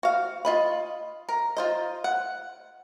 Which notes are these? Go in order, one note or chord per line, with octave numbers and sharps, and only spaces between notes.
F#4 F5
F4 D#5 B5
A#4
F4 C5 D#5
F#5